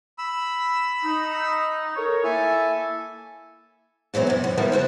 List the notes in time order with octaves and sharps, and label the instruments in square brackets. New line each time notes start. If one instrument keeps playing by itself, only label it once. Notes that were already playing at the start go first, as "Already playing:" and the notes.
[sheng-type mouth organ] B5 E6
[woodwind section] D#4
A4 A#4 C#5
[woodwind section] A#3 E4 A4 [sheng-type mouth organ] E5 G#5
[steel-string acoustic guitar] A#2 E3 F#3 B3 C4
F#2 C3
F#2
F3 G3 B3 E4 A#4 C5
C#3 F#4 C5